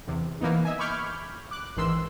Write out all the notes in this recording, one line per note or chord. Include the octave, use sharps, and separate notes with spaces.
E2 C3
E3 A#3 B3 D#4
D#5 E5 G#5
B5 C#6 D6 F6 G6 G#6
D6 F#6
A1 G#2 D#3 E3 C6 E6